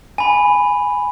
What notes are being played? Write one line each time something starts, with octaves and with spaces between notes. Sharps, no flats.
G#5 B5